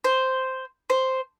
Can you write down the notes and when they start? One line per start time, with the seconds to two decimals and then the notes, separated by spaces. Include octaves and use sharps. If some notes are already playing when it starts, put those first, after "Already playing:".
0.04 C5
0.90 C5